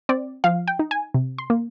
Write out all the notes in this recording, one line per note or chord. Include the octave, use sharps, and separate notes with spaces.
C4 D5
F3 F5
G5
D#4
G#5
C3
C6
A#3